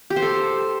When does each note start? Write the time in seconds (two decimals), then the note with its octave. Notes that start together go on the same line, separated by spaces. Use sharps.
0.10 G4
0.16 C5
0.22 A4